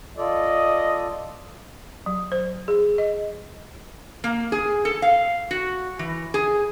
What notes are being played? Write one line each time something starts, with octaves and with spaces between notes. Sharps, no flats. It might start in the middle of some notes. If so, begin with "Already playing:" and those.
F4 A4 D5 D#5
F#3
C5
G#4
D#5
A#3
G#4
A4
F5
F#4
E3
G#4